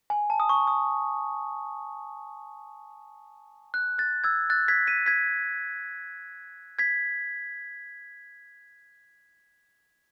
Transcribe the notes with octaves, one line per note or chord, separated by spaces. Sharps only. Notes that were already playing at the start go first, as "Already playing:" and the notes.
G#5
A5
D#6
C#6
D#6
F#6
F#6 A6
E6 G#6
F#6 A6
G#6 B6
B6 D#7
G#6 B6
G#6 B6